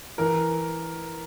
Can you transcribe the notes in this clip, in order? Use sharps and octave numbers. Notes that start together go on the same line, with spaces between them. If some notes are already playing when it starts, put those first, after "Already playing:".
E3 A#4